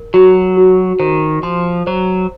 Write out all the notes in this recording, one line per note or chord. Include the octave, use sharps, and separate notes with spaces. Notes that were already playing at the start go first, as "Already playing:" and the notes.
Already playing: A#4
F#3 F#4
F#4
D#3 C5
F3 C6
F#3 C5